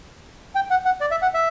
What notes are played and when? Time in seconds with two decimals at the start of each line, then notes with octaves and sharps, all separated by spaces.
0.55 G5
0.70 F#5
0.85 F#5
1.01 D5
1.11 E5
1.22 F#5
1.34 E5